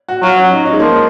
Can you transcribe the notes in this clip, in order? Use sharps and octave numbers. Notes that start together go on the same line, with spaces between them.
F#4
F#3 F4
C#4
D#4
D#4
G#3
F3 A#3